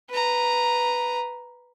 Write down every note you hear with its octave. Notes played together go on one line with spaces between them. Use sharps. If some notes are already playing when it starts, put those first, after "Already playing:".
B4 A#5